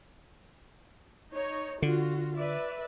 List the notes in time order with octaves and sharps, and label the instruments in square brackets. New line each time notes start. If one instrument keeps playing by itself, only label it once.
[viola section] D#4 C#5
[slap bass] D3 [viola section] F4 F#4
[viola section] B4 D5 E5